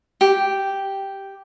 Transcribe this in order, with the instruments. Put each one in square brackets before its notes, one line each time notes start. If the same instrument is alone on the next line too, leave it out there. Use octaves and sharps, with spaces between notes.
[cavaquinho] G4